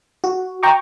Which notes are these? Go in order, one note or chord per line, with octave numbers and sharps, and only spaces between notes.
F#4
G5 A#5 C#6 D6